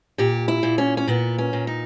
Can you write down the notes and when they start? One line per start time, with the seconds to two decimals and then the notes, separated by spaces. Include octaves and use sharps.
0.18 A#2 G4
0.48 E4
0.63 A#2
0.78 C#4
0.97 C#4
1.07 A#2 B3
1.38 C#4
1.53 A#2
1.67 D#4